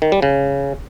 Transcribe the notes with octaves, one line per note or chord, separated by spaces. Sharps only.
D#3
G3
C#3